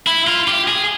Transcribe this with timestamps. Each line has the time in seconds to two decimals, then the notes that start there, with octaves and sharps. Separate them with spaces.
0.07 E4
0.27 F4
0.48 G4
0.68 G#4